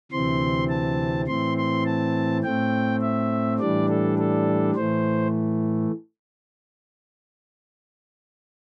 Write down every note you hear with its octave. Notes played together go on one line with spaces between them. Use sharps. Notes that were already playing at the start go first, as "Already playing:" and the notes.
D2 C3 E3 C4 C6
A5
A2 E3 C4 C6
C6
A5
A2 A3 C4 G5
E5
A2 E3 G3 D4 D5
A4
A4
A2 E3 A3 C5